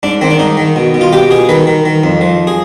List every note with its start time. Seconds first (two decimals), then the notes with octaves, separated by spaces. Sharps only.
0.03 G#2 D4
0.21 D#3 C4
0.31 D4
0.39 G#2 D#4
0.57 D#3
0.76 B2
0.94 B2
1.01 F4
1.13 B2 G4
1.31 B2 G#4
1.49 D#3 B4
1.67 D#3
1.85 D#3
2.04 F2
2.21 F3
2.47 G#4